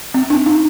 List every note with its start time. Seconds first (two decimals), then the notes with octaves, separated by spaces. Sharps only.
0.14 C4
0.30 D4
0.46 D#4